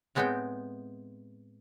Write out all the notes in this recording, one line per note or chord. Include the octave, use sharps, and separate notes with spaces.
A2 G#3 B3 C4 D#4 G5